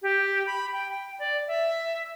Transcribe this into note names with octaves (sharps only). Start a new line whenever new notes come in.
G4
B5
G5
G5
D5
E5